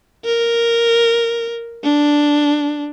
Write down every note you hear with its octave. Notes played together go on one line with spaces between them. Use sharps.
A#4
D4